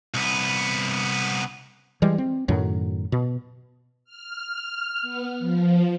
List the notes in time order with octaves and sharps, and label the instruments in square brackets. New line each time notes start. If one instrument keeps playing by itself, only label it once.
[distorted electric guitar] C2 B3
[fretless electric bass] E3 G3 G#3
C4
F#2 A2 D#3 F#3
B2
[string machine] F6
B3
F3